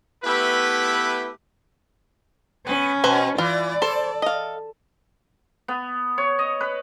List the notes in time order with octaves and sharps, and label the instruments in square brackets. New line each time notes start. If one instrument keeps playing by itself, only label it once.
[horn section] A3 B3 E4 G4 B4
[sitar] B3 [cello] C#4
[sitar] B2 [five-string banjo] B4 C5 G#5
[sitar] E3 [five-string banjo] F4 [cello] D5
[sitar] A4 [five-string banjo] C5
[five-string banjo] D#5 F5
[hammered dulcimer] B3
C#5
D#5
B4